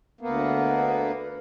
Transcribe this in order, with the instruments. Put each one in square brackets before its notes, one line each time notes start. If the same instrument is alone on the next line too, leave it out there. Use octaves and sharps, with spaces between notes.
[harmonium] D2 A#3 B3